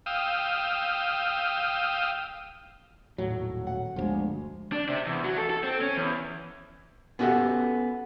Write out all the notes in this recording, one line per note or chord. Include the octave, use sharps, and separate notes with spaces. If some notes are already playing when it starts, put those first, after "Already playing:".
F5 G5 D#6 E6
D#1 A2 F#3
F#5
G1 D2 F3 G#3
D4
C3
E2
F#3
A4
A4
C4
C#4
E2
B3 C#4 F#4 G4 A4 F#5